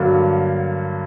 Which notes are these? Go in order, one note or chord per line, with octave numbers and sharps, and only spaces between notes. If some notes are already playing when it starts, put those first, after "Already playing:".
Already playing: G2 D3 F#3 A#3